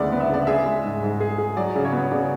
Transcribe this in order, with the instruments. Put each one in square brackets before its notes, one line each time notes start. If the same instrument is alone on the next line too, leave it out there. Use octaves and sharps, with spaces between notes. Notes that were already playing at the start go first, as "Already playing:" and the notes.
Already playing: [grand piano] D2 C#3 G#3 B3 [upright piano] D5
[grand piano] B3
[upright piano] E5
[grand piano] C#3 [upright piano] D5
[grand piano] G#4 [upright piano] E5
[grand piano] G#3
G#2
G#2
G#4
G#4
[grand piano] F#3 [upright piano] D5
[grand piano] C#3
[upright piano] C#5
[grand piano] B3
[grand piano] C#3 [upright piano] D5